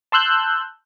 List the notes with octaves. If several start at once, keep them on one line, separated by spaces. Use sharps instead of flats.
A5 C6 E6 F#6 G6